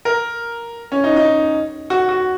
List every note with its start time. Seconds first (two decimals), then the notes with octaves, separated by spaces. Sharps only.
0.05 A#4
0.92 C#4
1.04 D#4
1.16 D#4
1.90 F#4
2.09 F#4